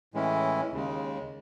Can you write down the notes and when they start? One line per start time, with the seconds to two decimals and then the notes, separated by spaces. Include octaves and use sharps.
0.14 A2 E3 G#3 C#4 E4
0.72 D#2 C#3 G#3